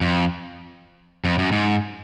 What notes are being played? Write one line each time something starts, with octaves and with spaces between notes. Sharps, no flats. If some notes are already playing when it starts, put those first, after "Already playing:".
F2
F2
F#2
G#2